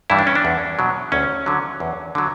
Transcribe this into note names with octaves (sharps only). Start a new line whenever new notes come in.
G2 E3 G3 E4
D4
C#4
D4
E2
B2 F#3
D2 C#4
D3 F#3
E2
D3 F#3